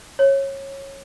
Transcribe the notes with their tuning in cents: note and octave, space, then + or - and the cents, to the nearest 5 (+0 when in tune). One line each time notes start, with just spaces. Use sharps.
C#5 -20